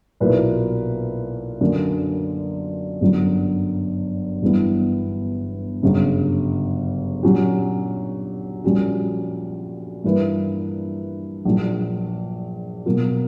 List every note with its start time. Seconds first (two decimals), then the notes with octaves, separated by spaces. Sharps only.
0.20 B1 A#2 A#3 E4 B4
1.61 F#2 D3 A#3 C#4
3.01 G1 F#2 D3 F#3
4.42 G1 G2 E3 B3
5.82 G1 F#2 C#3
7.23 A#2 F#3 C#4 G4
8.64 A#1 A#2 G3 C#4 F#4
10.04 G2 E3 A#3 E4 B4
11.45 A#1 A#2 F#3
12.86 B2 F#3 A#3